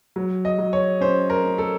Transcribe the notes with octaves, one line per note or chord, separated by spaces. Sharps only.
F#3
D#5
F#3
C#5
C#4 C5
A#4
C#4
A4